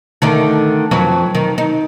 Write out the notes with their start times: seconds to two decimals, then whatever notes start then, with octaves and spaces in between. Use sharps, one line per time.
0.22 D3 D#3 A3
0.91 F2 F#3 B4
1.35 D#3
1.58 D#4